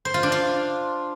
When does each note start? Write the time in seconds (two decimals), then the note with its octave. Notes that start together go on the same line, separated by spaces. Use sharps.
0.05 C5
0.14 F4
0.23 D4
0.32 F4